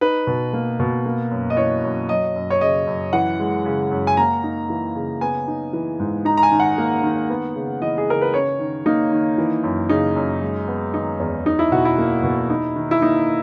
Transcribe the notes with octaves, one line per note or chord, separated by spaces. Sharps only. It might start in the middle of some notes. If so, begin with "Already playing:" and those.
D#4 B4
B2
A#3
B2
A#3
F#2
D#5
E3 C#5
F#2
F#3 D#5
F#2
C#5
C#3 D#5
F#2
E3 F#5
G#3
C#3
F#2
G#5
A#3 A#5
D#4
E3
C#3
B3 G#5
D#4
E3
G#2
D#4 A#5
A#5
G#5
D#3
F#5
A#3
D#3
B3
C#3
E3 D#5
G#4
C#3 A#4
B4
C#4 C#5
D#3
A#3 D#4
D#3
E3
F#2
C#3 D#4
F#2
G#3
B3
D#3 D#4
E2
D#4
E4
B2 F#4
E4
A#3
B2
D#4
D#3
E4
A#3 D#4